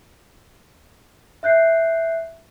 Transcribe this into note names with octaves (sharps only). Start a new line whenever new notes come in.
E5 F#6 G6 C7